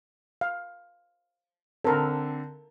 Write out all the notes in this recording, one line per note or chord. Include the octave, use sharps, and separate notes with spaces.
F5
D3 C4 A4 A#4